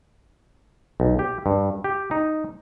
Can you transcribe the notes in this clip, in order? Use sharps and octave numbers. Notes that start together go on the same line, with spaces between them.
B1
G4
G2
G4
D#4